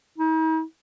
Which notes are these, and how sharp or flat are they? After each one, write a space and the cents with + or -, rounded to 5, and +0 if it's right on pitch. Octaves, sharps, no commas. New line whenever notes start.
D#4 +45